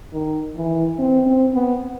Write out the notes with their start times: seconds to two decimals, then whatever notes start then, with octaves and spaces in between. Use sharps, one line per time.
0.13 D#3
0.56 E3
0.99 C4
1.26 C4
1.54 B3